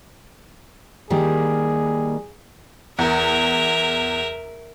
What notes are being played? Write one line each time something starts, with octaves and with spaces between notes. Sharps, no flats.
D#3 G3 A#3 G#4
E2 A#4 E5